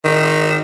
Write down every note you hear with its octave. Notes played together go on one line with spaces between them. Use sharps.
D#3